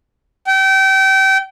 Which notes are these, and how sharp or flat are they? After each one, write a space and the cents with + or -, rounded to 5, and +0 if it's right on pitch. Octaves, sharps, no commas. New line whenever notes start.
G5 -30